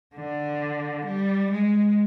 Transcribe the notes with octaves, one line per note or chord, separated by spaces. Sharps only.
D3
G3
G#3